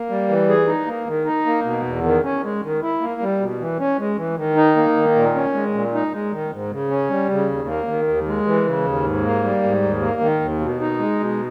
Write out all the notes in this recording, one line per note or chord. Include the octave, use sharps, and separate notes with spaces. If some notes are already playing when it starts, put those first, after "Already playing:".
Already playing: A#3
G3
E3
G#4
D#4
A#3
D#3
D#4
A#3
B2
E2
D#3
C#4
G#3
D#3
E4
A#3
G3
B2
E3
C#4
G#3
E3
D#3
D#4
A#3
D#3
A#2
C#4
G#3
A#2
D#4
G#3
D#3
G#2
C#3
C#4
G3
C#3
D#2
A#3
D#3
D#2
G#3
E3
C#3
D#2
G#2
A#3
G3
G#2
D#2
A#3
D#3
D#2
B2
D#4
G#3
B2